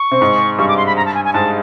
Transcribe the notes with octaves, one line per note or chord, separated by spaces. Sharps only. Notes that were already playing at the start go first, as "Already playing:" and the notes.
Already playing: C#6
C3 C4
G#2 G#3
G2 G3 C#6
D6
C6
B5
A#5
A5
G#5
G#5
G#2 G#3 A5